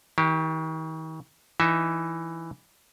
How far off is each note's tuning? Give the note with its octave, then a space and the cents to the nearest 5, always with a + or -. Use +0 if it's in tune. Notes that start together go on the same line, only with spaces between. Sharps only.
D#3 +45 G4 -5
E3 +5 D#4 +0 E5 +0